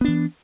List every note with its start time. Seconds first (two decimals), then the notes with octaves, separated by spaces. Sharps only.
0.01 B3
0.04 D4
0.08 E3